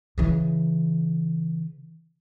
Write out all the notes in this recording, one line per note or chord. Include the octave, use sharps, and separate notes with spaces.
C#3 E3